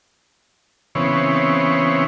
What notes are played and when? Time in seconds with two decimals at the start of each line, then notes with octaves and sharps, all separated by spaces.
0.95 C#3 E3 B3 C4 C#5